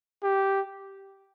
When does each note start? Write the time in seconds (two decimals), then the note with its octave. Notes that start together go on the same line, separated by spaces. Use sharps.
0.23 G4